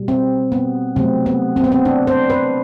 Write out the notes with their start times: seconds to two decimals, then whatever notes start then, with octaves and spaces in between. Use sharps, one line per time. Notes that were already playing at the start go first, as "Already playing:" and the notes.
Already playing: B2 G3
0.08 C4
0.52 B3
0.96 C3 F#3 A3 C4
1.26 B3
1.56 C4
1.64 B3
1.72 C4
1.85 D4
2.07 C5
2.30 B4